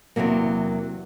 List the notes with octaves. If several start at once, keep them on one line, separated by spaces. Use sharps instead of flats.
E2 G#2 C3 F#3 A#3